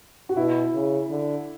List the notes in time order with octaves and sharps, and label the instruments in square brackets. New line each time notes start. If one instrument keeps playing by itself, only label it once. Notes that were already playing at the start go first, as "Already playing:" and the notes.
[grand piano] F#4
[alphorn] B2 [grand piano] E4
[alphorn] C#3
D3